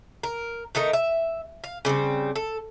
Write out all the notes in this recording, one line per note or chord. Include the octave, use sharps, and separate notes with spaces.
A#4
D#3 A3 D#4 A#4
E5
F5
C#3 G3 B3 C4
A4